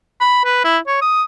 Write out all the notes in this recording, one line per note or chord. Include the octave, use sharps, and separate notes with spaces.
B5
B4
E4
C#5
D#6